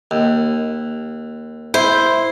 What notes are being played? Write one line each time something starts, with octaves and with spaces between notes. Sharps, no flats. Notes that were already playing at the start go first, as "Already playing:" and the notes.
D#2
E4 C5